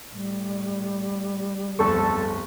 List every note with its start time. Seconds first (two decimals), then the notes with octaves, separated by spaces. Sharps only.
0.13 A2 G3
1.79 D1 G1 F2 A4 C#6